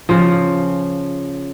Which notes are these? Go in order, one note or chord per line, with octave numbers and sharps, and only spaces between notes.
C#3 F3